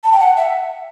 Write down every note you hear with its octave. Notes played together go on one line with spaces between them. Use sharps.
A5
G5
F#5
E5